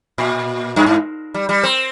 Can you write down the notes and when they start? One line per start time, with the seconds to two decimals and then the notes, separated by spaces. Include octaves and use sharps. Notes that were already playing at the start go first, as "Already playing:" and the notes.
0.18 A#2
0.76 G2
0.86 G#2
1.34 G3
1.49 G3
1.63 C4